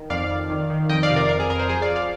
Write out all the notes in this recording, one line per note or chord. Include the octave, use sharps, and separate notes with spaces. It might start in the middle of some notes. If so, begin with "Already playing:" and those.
Already playing: D#3
F2 D5 F5
F2
D#3
D#3
F2 D#5 G5
D5 F5
C3
A#4 D5
F2 A#4
G#4
F2 A#4
G#4 C5
F3 G#4 C5
D5 F5
F3
D5 F5